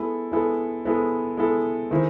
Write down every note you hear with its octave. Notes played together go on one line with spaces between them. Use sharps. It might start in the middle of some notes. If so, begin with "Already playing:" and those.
Already playing: G#3 B3 E4 A4
G#3 B3 E4 A4
G#3 B3 E4 A4
G#3 B3 E4 A4
D#3 G#3 C4 E4